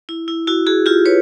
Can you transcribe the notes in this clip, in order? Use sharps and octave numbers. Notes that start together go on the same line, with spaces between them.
E4
E4
E4 F#4
F#4 G#4
F4 G4
B4 C#5